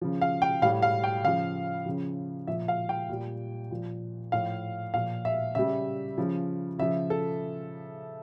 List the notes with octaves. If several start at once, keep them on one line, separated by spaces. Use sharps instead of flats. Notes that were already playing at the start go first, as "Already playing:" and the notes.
C#3 F3
F5
G5
A2 G3 F5
F5
G5
C#3 F3 F5
C#3 F3
A#2 F3 E5
F5
G5
A#2 G3
A#2 F3
A2 F3 F5
A#2 F3 F5
E5
C#3 G3 E5
C#3 F3
C#3 F3 E5
A4